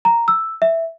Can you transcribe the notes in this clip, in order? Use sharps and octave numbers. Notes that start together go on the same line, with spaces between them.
A#5
E6
E5